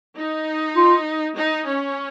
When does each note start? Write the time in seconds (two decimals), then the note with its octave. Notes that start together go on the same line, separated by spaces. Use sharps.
0.17 D#4
0.76 F4
1.36 D#4
1.66 C#4